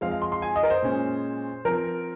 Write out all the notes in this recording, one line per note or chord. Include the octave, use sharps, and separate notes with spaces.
F3 G#3 C4 F5
F5
C6
C6
G#5
D#5
A#4
C5
A#2 G#3 C#4
F3 C4 A#4